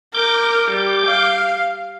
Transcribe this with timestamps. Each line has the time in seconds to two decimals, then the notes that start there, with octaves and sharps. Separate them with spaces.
0.15 A#4 D6 G6
0.71 G3
1.06 F5